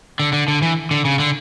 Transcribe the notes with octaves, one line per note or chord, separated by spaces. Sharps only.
D3
D3
D3
E3
D3
C#3
D3